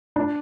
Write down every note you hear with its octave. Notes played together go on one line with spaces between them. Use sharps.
D4